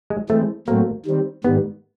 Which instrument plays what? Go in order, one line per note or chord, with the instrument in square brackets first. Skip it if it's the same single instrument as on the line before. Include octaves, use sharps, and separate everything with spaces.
[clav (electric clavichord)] G#3
[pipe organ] E3 G#3 C4 [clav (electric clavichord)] A3
[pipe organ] A2 F#3 A3 C4 [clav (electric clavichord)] A#3
[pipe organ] D#3 G3 C4
[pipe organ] G#2 D#3 G3 [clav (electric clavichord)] B3